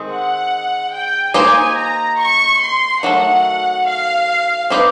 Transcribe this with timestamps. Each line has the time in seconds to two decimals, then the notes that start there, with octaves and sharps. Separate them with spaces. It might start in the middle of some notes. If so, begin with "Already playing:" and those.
Already playing: D#3 G#3 C4
0.10 F#5
0.93 G5
1.34 A#3 D#4 G4 C5 D#5 G#5
1.77 A#5
2.19 C#6
2.61 C6
3.03 D#3 F#3 A3 F#5
3.87 F5
4.70 C4 D#4 G4 B4 D#5